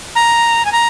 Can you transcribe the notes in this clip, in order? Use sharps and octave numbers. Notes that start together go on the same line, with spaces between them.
A#5
G#5
A#5